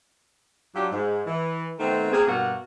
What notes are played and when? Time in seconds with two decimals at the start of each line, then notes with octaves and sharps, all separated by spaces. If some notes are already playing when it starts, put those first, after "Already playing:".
0.75 F#3 D4 F4 G4
0.92 G#2
1.26 E3
1.79 D#3 A3 B3 C4
2.11 A#3 C4 G#4
2.26 G2 B2 A#3 F#4 A#4